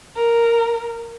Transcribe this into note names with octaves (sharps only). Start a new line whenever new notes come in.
A#4